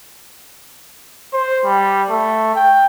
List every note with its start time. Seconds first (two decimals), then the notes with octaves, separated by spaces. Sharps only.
1.33 C5
1.64 G3
2.09 A3
2.55 G5